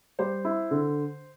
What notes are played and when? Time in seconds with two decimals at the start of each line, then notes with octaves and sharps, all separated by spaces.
0.19 G3 C5
0.45 E4
0.71 D3